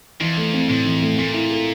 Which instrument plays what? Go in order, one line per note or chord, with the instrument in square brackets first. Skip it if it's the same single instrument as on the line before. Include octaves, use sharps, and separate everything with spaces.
[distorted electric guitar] F2 [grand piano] E3
[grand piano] A3
C4
[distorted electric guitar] F2 [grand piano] A2
[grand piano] E3
A3
[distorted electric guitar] A#2 [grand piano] A3
[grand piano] E4
A4